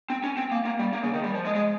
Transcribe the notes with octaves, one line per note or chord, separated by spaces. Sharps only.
C4
C#4
C4
A#3
A#3
G3
A#3
C#3
D#3
G3
F3
G#3
G#3